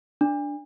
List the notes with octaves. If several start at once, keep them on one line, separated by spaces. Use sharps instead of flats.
D4